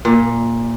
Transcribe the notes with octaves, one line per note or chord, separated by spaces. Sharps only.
A#2